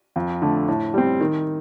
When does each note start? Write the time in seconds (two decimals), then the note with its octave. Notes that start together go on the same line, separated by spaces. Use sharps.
0.16 F2
0.42 D3 A3
0.68 A2
0.94 G3 C4
1.21 D#3